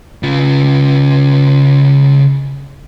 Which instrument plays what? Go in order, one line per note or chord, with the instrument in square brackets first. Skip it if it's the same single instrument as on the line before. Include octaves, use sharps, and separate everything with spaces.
[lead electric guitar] C#3 F4